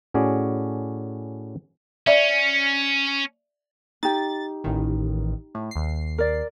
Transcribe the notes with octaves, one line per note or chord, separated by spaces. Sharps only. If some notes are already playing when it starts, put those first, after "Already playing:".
A2 C#4 F#4 G#4 D5
C#4 D5 E5
D#4 G4 A6
A1 D#3
A2
D#2 C7
A#4 D5